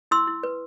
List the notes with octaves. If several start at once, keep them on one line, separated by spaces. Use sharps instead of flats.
E4 C6 E6
E4
B4